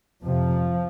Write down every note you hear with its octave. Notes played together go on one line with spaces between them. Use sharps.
F2 C3 F3